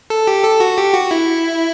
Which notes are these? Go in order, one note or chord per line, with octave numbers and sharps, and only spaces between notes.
A4
G4
A4
F#4
G4
F#4
E4